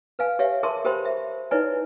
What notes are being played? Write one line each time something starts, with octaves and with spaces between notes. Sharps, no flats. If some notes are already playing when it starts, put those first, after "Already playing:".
B4 F5 G#5
G4 C#5 E5 F5
G#4 A#4 E5 A5 C6 C#6
G4 A#4 C5 G5 B5 C6
E5
D#4 E4 B4 C#5 D5 G#5